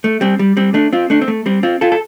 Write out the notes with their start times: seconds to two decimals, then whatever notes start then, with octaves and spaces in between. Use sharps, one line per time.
0.04 A3
0.21 G3 C4
0.39 G3
0.57 G3 C4
0.74 A3 D4
0.93 C4 F4
1.10 A3 D4
1.22 C4
1.28 A3
1.46 G3 C4
1.63 C4 F4
1.81 F4 A4
1.92 A4